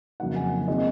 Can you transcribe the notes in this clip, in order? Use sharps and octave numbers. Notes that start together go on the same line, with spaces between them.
F2 C#3 F#3 A#3 D#4 F#5
G#5
D#3 G#3 C4 F4 D#5